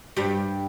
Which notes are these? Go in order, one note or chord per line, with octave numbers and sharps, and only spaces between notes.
G2 G3